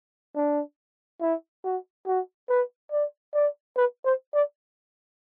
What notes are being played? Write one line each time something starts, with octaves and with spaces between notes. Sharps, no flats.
D4
E4
F#4
F#4
B4
D5
D5
B4
C5
D5